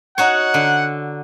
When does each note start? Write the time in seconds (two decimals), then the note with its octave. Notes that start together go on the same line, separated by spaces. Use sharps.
0.18 D#4 F#4 C#5 F#5
0.54 D3